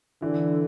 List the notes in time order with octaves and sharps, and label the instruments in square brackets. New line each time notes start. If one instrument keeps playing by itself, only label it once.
[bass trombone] D3 [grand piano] E3